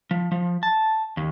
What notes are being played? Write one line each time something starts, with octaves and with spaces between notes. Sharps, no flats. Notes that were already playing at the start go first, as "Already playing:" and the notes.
F3
F3
A5
D#2